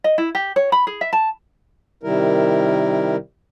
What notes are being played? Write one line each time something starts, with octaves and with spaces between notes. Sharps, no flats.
D#5
E4
G4
C#5
B5
G#4
E5
A5
C3 D#3 G3 E4 A#4